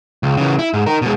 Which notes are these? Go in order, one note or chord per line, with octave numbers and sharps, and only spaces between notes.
C#2
C#3 E3
E4
G#2
D#4 A#4
B2 G#3